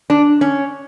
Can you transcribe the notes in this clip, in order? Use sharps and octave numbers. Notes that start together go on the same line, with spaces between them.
D4
C#4